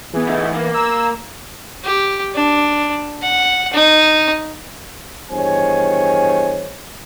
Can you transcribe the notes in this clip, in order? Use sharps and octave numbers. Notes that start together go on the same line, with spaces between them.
E3 B3 G#4
A3 D#4
A#3 F5
A#5 E6
G4
D4
F#5
D#4
E2 G2 D#3 C5 C#5 G#5